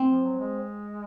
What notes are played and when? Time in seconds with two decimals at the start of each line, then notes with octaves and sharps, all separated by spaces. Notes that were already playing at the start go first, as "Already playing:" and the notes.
Already playing: C4
0.09 F3
0.24 F#3
0.39 G#3